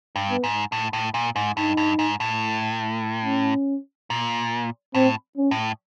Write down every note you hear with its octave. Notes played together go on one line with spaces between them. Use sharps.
G2
B3
G#2
A2
A2
A#2
G#2
G2 D#4
G2
G#2
A2
C#4
A#2
A2 C4
C#4
A2